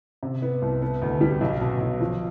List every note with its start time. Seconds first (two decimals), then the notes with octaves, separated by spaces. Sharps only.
0.23 C3
0.42 B3
0.62 C2
0.82 B3
1.02 D2
1.21 G3
1.41 B1
1.61 B2
1.81 B1
2.00 F3